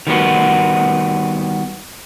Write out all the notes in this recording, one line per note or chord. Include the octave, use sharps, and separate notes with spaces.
D#3 G3 B3 F#4